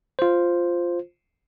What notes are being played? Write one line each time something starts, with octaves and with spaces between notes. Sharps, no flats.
F4 C5